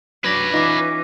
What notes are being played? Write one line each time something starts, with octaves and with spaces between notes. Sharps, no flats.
F#3 D4 B4 D5 G#6 A#6 B6
E3 C#4 D#4 F4 D6 A#6